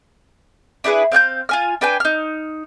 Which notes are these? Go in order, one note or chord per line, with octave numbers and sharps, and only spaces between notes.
D4 E4 G#4 B4
C4 F5 F#6 G6
F4 G#5 F6
D4 B4 G5 G#5
D#4 F6